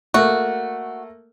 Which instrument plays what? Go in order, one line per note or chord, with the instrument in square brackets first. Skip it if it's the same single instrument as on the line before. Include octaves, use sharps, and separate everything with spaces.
[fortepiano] A3 A#3 [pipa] F#4